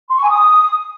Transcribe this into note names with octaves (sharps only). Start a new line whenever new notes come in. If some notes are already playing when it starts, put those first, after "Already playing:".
C6
C#6
G#5
D#6